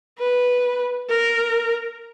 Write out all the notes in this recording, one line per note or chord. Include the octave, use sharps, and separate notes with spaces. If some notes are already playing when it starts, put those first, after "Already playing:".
B4
A#4